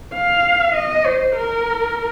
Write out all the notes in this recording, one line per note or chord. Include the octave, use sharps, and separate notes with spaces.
F5
D#5
C5
A#4